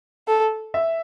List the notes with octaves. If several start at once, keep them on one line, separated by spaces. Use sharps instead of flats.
A4
E5